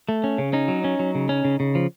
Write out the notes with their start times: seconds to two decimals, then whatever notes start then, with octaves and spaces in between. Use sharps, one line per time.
0.09 A3
0.24 C#4
0.38 C#3
0.53 C#4 D#4
0.68 F#3
0.84 C#4
0.99 F#3
1.15 C#3
1.29 C#4
1.45 C#3
1.60 C#3
1.75 F3